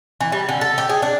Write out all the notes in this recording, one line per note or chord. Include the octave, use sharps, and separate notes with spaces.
E3
G3
D3
A4
G4
G#4
D4